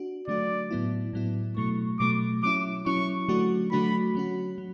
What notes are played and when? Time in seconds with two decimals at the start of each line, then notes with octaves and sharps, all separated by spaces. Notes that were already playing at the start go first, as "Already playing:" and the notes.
Already playing: D4 F#4
0.28 D3 F#3 A3 D4 F#4 D5
0.71 A2 F#3 B3 E4
1.13 A2 F#3 B3 E4
1.57 B2 F#3 A3 C#6
1.99 B2 F#3 A3 D6
2.43 F#3 C#4 E4 D6
2.86 F#3 C#4 E4 C#6
3.28 D3 F#3 A3 D4 F#4
3.72 D3 F#3 A3 D4 F#4 B5
4.15 F#3 C#4 F#4
4.58 F#3